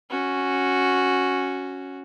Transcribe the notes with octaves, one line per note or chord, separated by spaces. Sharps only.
C#4 F#4